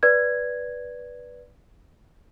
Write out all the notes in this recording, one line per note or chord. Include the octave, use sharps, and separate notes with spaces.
B4 D5 G#6